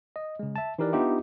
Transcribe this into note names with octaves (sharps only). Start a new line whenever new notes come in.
D#5
C#3 G#3
E5 A5
E3 D#4 G4 A#4 B4 D5
B3 D4 D#4 F4 G4 E5